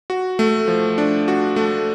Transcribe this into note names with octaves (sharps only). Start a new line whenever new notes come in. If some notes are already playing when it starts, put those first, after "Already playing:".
F#4
A3
F3
D4
F#4
A3